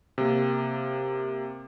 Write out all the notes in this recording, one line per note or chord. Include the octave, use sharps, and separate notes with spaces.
C3 A#3